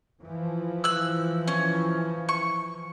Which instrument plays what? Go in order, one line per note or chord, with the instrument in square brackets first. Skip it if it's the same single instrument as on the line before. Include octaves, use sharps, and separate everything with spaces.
[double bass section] E3 F3
[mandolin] E6 F#6
C#4
C#6